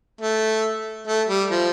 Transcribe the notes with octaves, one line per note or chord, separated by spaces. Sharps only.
A3
A3
G3
F3